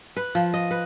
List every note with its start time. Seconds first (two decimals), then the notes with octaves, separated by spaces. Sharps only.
0.17 B4
0.35 F3
0.54 D#5
0.71 B4